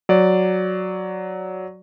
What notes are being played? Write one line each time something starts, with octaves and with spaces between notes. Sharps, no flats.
F#3 D5